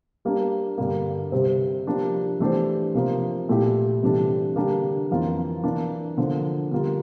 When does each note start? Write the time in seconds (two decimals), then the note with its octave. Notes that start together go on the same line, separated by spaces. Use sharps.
0.25 G3 A#3 D4
0.78 G2 D3 G3 A#3
1.32 C3 G3 C4
1.87 F3 A#3 D4 G4
2.40 E3 A3 D4 G4 C5
2.94 C3 F3 A#3
3.49 A#2 A3 E4 G4
4.02 C3 E3 G3 D4 A4
4.56 D3 G3 A#3 D4 G4
5.11 F2 E3 A#3 F4
5.63 E3 A#3 D4
6.17 D3 F3 A#3
6.71 D3 G3 A#3 F4